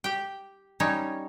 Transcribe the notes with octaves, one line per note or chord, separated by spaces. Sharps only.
G4 G5
G3 C#4 D#4 C#5